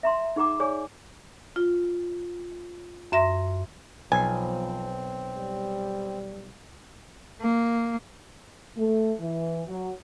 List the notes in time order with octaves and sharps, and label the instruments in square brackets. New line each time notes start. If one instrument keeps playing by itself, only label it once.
[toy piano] E5 A#5 C6
D#4 G#4 F#5 A#5 D6
G#4 C#5 D5 G#5
[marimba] F4
F#2 E5 C6 A#6
[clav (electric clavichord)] B1 [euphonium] F3 [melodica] C4 [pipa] G#5
[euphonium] G3
[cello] A#3
[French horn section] A3
E3
F#3